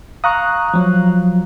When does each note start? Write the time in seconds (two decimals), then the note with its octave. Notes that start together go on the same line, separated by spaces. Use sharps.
0.24 F5 A#5 C#6 D#6 F#6
0.74 F3 F#3